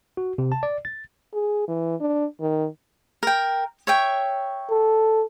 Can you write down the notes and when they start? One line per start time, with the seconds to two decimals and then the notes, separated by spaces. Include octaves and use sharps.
0.17 F#4
0.38 C3
0.52 A5
0.63 D5
0.85 A6
1.34 G#4
1.68 E3
2.01 D4
2.41 D#3
3.23 A#4 G5
3.87 C#5 E5 G5
4.71 A4